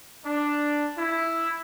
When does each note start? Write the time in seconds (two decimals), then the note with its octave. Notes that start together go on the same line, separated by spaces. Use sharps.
0.24 D4
0.97 E4